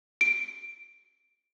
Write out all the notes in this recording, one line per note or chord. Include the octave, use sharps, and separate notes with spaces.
D7